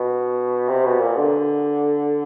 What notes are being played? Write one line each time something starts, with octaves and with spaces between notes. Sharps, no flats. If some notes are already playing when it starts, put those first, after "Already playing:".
Already playing: B2
C3
B2
A#2
D3